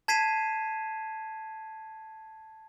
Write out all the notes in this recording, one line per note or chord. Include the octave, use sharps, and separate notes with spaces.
A5 G#6 B6 C7 D#7 E7